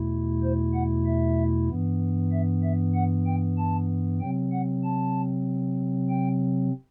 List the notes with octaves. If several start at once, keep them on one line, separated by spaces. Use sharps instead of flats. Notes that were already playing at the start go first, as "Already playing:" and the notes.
Already playing: E2 B2 A3 E4
C5
F#5
E5
G2 E3 B3
E5
E5
F#5
G5
A5
C3 F#3 C4 G5
F#5
A5
G5